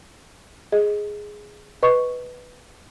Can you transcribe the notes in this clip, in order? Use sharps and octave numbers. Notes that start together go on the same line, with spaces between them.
G#4 D#5
B4 D#5 C#6